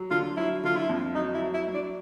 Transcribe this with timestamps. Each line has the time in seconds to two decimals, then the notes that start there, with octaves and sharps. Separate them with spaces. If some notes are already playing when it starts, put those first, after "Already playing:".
Already playing: F#3
0.11 D3 F4
0.37 F#3 E4
0.64 D3 F4
0.77 E4
0.89 F2
1.15 F#3 D#4
1.34 E4
1.42 F#3
1.54 E4
1.68 F#3
1.74 D4